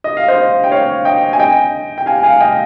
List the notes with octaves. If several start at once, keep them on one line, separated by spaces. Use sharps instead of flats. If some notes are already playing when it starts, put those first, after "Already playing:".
D#5
F5
C5 D#5
G5
C#5 F5
D#5 G5
G#5
D#5 G5
G5
F5 G#5
F5 G#5
D#5 G5